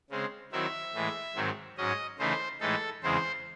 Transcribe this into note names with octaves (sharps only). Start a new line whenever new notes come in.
C#3 G#3 C4
D#3 F#3 C4 E4 E5
A2 E3 G#3
G#2 D#3 F#3 C4
G#2 F#3 C#4 D#5
C#3 E3 A3 D#4 C5
A2 E3 G#3 D#4 A4
E2 C#3 G#3 C4 E4 C5